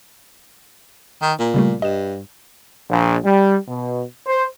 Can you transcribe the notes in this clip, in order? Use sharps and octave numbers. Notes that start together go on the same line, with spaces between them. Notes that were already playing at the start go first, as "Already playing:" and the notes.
D#3
A#2
C#3 G3 A3
G2 D#5 E7
A#1
G3
B2
C5